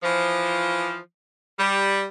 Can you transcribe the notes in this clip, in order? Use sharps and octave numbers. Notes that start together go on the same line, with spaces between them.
E3 F3
G3